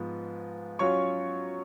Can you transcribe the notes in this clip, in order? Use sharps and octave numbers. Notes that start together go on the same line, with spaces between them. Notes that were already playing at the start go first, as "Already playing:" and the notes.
Already playing: G#2 F3 B3
F#3 C#4 F4 C#5 C#6